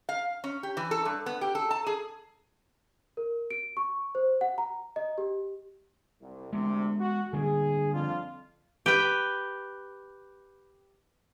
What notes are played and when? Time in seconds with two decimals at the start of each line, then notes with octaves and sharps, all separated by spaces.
0.09 F5
0.44 C#4
0.63 G4
0.77 E3
0.91 A4
1.05 G2
1.26 B3
1.41 G4
1.55 A4
1.71 A5
1.87 G#4
3.17 A#4
3.51 D7
3.77 C#6
4.15 C5
4.41 F#5
4.58 A#5
4.96 D#5
5.18 G4
6.22 C2
6.53 D2 C3 G#3 B3
7.00 F#4
7.33 D3 G3 A#3 G#4
7.94 F2 D4 F4
8.86 G4 B4 G5